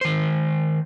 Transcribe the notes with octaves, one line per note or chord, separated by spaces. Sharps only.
D#3 C5